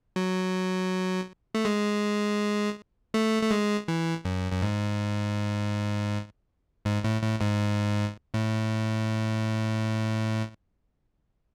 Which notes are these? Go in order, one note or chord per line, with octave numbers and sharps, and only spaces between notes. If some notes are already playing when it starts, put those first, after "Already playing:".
F#3
A3
G#3
A3
A3
G#3
E3
F#2
F#2
G#2
G#2
A2
A2
G#2
A2